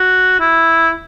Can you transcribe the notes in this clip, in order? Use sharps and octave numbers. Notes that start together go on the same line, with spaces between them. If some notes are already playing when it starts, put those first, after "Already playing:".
Already playing: F#4
E4